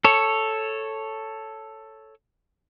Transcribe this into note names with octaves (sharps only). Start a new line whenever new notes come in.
A4 C#5